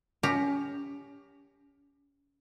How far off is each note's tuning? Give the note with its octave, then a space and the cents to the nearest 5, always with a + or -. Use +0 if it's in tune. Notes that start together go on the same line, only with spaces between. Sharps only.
C#4 +30 G4 +20 A#5 +0